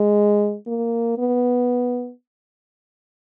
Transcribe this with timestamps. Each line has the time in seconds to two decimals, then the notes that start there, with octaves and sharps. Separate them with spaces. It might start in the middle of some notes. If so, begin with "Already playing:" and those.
Already playing: G#3
0.67 A#3
1.18 B3